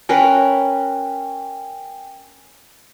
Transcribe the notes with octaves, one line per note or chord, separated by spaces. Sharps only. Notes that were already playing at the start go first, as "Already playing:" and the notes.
C#4 A#4 B4 G5 G#5